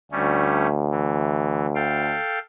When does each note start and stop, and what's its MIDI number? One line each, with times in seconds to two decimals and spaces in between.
0.12 2.17 38
0.12 0.67 55
0.12 0.67 57
0.12 0.67 61
0.91 1.66 52
1.75 2.39 69
1.75 2.39 77
1.75 2.39 79